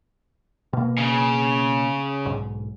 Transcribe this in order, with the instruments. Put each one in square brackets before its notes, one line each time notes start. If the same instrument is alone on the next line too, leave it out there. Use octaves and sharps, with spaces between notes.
[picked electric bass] B2 A#3
[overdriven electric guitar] C#3
[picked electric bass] B1 G#2